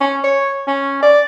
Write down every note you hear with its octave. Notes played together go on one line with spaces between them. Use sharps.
C#4
C#5
C#4
D5